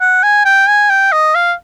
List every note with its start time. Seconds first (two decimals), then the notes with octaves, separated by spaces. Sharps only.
0.01 F#5
0.23 G#5
0.45 G5
0.68 G#5
0.90 G5
1.12 D#5
1.35 F5